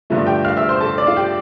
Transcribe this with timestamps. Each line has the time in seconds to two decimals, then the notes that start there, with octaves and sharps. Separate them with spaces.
0.10 G2 D3 F3 A3
0.27 G4 G5
0.45 F5 F6
0.57 E5 E6
0.69 C5 C6
0.81 A4 A5
0.98 D5
1.07 F4 F5
1.16 G4 G5